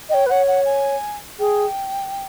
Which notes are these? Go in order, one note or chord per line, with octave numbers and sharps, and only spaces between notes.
C#5 D#5 G5
B4
C#5 F#5
F#5
G#5
G#4 G5